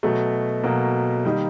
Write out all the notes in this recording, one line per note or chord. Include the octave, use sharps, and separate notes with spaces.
B2 F#3 A3
B2 F#3 A#3
D#3 G3